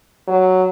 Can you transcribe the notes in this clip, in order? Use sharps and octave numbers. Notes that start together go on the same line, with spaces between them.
F#3